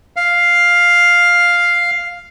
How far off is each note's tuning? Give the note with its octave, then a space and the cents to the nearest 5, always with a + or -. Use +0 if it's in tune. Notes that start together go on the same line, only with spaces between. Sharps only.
F5 +5